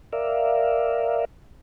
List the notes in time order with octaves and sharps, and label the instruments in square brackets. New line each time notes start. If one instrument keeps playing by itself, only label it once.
[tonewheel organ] A#4 D5 E5 F5